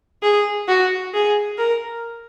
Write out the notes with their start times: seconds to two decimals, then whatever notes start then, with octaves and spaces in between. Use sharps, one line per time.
0.23 G#4
0.68 F#4
1.13 G#4
1.58 A#4